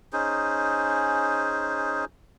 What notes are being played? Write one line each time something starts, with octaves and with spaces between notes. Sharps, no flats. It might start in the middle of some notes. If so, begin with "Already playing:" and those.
C#4 D#4 G#4 C5